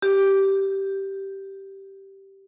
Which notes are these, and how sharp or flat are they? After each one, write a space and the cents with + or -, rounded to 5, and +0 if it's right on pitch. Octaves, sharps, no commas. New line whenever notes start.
G4 -10